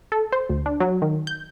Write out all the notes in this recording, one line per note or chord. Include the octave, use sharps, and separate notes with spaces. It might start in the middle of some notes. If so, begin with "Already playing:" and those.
A4
C5
D2
D4
F#3
D#3
G6